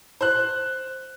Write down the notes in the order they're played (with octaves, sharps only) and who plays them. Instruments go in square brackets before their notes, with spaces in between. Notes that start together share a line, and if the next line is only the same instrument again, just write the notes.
[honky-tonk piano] C5 F#6